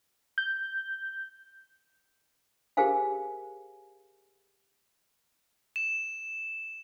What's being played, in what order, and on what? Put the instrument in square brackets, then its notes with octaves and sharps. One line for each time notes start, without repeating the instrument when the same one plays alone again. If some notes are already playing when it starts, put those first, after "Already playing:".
[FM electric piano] G6
[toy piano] G4 G#4 A#4 C5 F5 G#5
[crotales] E7